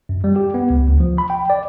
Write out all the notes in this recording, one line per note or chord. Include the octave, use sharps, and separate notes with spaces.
F#2
G3
G4
B3
C#2
D2
F3
B5
G5
D5